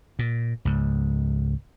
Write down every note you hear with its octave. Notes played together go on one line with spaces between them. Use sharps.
A#2
C#2 G#2